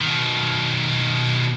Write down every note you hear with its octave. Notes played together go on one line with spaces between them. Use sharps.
B2 D#3